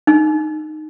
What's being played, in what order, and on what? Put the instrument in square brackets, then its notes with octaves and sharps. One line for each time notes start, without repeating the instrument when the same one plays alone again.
[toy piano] D#4